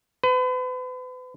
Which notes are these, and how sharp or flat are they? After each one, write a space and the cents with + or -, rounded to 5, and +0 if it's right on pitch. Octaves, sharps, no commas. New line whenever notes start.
B4 +40